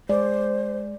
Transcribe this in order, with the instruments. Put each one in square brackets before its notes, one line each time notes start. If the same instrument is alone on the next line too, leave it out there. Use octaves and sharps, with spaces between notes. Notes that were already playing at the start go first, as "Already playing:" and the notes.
[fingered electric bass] G#3 [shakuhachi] C5 [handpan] D5